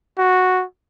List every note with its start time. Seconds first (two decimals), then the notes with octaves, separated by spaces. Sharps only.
0.18 F#4